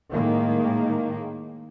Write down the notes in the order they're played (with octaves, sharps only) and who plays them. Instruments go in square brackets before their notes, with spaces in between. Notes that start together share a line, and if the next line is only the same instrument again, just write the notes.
[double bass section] A2 D#3 G#3 A#3